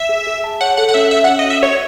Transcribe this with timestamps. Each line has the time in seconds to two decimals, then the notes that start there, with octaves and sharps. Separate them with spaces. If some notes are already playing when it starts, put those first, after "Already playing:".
Already playing: E5
0.09 G#4
0.27 G#4
0.44 A5
0.61 C#5 F#5
0.77 A4 F#5
0.89 F#5
0.94 C#4 E5
1.11 C#5 E5
1.24 F#5
1.29 C#4
1.39 D#5
1.45 F#4
1.50 E5
1.62 F#4 C#5